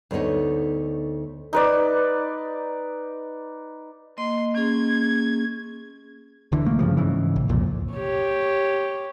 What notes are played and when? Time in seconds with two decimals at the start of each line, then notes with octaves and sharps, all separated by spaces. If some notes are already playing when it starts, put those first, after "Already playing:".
0.11 D2 A3 B3 D#4 C#5
1.53 D#4 B4 D5
4.18 A#3 D#5 C6
4.55 A#3 C#4 G#4 G#6
6.52 D1 D3 E3
6.66 B1 A3 A#3
6.79 G2 C#3 F3
6.97 G#2 C#3 E3
7.36 A#1
7.49 C2 F2 A#2
7.94 G4 C#5